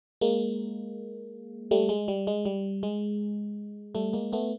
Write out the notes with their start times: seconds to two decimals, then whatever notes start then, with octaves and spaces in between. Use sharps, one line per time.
0.21 G#3 A#3
1.71 G3 A3
1.89 G#3
2.08 G3
2.27 G#3
2.45 G3
2.83 G#3
3.95 G3 A3
4.13 G#3 A#3
4.33 A3 B3